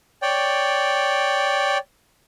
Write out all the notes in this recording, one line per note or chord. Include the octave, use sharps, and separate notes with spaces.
C#5 D5 G5